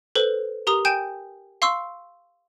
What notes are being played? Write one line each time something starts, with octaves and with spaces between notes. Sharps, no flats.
A4 B4 C5
G4 A#4 A#5 D#6
G5 G#5 G6 D7 E7
F5 C6 C#6 E6